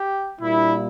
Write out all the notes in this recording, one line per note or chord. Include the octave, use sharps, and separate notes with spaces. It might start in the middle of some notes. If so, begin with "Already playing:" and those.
Already playing: G4
A#2 G3 A#3 D4 E4